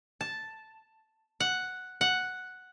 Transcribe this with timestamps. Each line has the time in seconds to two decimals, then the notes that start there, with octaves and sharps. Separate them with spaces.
0.21 A5
1.40 F#5
2.01 F#5